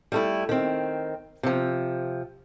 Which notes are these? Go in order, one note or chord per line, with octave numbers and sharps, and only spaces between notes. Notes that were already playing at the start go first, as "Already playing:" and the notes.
G3 A3 E4
D#3 C4
C3 F3